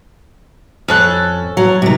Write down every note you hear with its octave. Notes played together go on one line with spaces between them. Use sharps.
F2 C#4 A4 F#6
F#3
C3 D#3